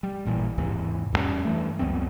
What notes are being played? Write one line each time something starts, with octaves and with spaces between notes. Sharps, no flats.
G3
A1 A#2 E3
D#2 G#2 C3 E3
E2 G2 G3 C#4
G2 E3 A3
C#2 F#2 B3 C4